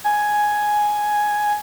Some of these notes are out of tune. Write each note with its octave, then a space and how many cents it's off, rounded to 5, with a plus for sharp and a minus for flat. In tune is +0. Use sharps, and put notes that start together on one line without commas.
G#5 +5